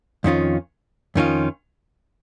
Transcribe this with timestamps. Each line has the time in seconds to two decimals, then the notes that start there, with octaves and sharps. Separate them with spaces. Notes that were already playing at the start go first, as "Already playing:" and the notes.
0.24 F2 D#3 C#4 F4
1.15 F2 D#3 C#4 F4